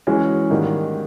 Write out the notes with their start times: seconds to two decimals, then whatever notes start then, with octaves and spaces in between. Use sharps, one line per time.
0.07 E3 G#3 C#4 F#4
0.50 G#2 D#3 G3 A#3